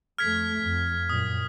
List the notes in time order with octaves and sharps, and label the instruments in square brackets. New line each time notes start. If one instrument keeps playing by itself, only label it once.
[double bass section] F2 A3 [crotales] F6 G#6 B6
[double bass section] F2
[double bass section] F#2 A#2 [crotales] D#6